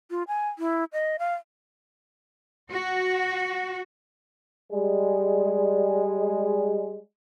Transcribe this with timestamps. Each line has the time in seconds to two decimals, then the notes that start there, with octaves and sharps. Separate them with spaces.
0.10 F4
0.28 G#5
0.59 E4
0.93 D#5
1.19 F5
2.70 F#4
4.71 G3 G#3